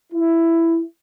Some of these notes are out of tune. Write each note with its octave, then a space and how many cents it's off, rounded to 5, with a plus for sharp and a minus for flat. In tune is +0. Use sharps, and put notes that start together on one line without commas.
E4 +10